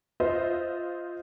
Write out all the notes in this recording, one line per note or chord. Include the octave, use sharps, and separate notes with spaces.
F4 C5 D#5 E5